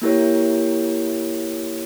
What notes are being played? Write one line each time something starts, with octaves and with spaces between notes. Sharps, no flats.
A#3 E4 G4 A#4 C#5